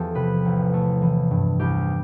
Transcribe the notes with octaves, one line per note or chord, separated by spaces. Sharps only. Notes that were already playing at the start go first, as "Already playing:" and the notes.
Already playing: E2 F3 G4 A4
C3 B4
A1
A3
E3
G2
C2 G4